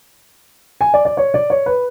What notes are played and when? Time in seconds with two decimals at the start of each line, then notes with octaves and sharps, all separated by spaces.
0.81 G#5
0.94 D5
1.05 D5
1.17 C#5
1.34 D5
1.50 C#5
1.66 B4